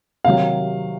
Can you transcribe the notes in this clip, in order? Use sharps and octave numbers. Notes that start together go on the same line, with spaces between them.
C3 D#3 F#3 F5